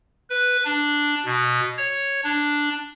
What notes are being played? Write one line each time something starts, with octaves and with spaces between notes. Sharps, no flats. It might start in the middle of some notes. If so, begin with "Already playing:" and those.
B4
D4
B2
C#5
D4